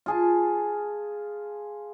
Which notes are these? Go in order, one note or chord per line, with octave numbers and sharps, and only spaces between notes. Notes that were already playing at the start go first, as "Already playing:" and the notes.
F4 G#4 A5